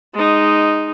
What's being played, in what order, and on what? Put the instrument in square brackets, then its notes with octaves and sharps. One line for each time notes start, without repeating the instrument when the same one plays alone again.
[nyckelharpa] G#3 D#4